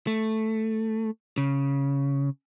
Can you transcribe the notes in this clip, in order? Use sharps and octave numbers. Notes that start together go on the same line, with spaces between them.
A3
C#3